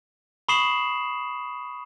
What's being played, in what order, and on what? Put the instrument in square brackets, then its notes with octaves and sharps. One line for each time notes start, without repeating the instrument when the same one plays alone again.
[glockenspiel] B5 C#6 D#6 C7 E7 F#7